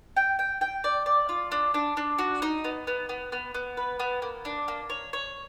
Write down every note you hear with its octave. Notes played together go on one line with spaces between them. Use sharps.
G5
G5
G5
D5
D5
F4
D4
D4
D4
F#4
D#4
B3
B3
B3
B3
B3
B4
B3
A#3
D4
A#3
C#5
C#5